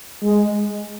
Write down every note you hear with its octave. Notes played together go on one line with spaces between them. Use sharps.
G#3